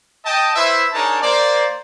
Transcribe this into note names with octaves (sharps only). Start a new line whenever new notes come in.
D#5 G5 A5
E4 B4 C5 E5
D4 D#4 G#4 A#4 C#5 A5
A#3 C5 D5